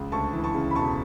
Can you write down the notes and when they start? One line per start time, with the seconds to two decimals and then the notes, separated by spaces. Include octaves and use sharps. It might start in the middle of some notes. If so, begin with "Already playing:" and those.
Already playing: C#2
0.12 D2 A5 C#6
0.33 E3
0.44 A5 C#6
0.54 C#3
0.71 B5
0.75 E1 A5 C#6